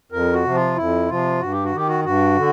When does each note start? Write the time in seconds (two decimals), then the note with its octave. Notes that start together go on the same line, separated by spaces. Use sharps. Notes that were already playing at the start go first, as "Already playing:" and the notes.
0.12 F2 A#4
0.34 F#4
0.44 C3 F3
0.55 F4
0.76 F2 E4
1.08 C3 F3 F4
1.40 G2 F#4
1.52 G4
1.64 F#4
1.72 D#3 G4
1.88 F#4
2.05 G2 F#4
2.37 D3